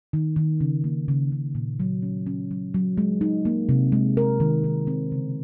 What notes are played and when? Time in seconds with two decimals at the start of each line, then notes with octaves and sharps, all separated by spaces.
0.13 D#3
0.36 D#3
0.60 C#3
0.84 A#3
1.08 C#3
1.32 C#3
1.55 A#2
1.80 F#3
2.02 C#4
2.27 C#4
2.51 F#3
2.74 F#3
2.97 G#3
3.21 D#4
3.45 A#3
3.69 C3
3.92 G#3
4.17 A#4
4.40 D#3
4.64 D#3
4.87 C4
5.12 C#3